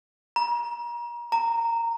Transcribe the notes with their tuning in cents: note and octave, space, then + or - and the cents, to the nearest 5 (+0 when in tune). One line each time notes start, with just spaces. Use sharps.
A#5 +35
A#5 -15